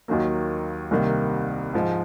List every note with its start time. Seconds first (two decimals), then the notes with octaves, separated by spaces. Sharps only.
0.08 D#2 D#3 F#3 A#3
0.91 C2 C3 D#3 A#3
1.73 G#2 F3 G#3